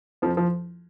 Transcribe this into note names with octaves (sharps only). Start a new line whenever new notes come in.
F2 F3
F3